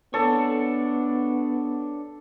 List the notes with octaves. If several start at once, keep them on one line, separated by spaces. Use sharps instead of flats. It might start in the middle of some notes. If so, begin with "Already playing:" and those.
B3 D4 A4 C#5